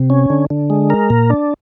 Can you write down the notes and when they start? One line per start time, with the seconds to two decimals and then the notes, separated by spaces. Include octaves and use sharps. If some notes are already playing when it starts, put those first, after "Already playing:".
Already playing: C3
0.10 C#4
0.30 D3
0.50 D3
0.70 G#3
0.90 A#4
1.10 A#2
1.30 D4